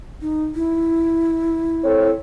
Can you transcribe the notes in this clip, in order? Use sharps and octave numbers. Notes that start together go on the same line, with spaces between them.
D#4
E4
C4 A4 C#5